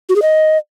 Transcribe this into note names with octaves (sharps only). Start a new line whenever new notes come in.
F#4
G#4
D#5